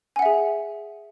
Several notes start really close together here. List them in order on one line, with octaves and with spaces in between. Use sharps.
G#5 F#5 E5 G#4